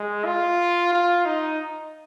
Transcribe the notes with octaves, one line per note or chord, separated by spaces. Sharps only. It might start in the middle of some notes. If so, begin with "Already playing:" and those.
Already playing: G#3
F4
F4
D#4